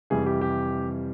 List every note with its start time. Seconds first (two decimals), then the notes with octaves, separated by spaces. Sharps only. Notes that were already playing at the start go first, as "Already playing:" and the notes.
0.10 F2 C3 E3 G3 G#4
0.26 G4
0.41 G4